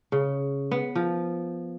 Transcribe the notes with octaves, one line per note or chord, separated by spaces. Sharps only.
C#3
B3
F3